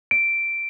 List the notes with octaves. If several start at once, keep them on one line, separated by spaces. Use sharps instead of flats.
D7